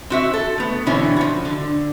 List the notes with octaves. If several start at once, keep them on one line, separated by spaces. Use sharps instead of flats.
C4 F#4 E5
A4
A3 B3
B2 D3 E3 C4 C#4 E4
F3 F#4
D3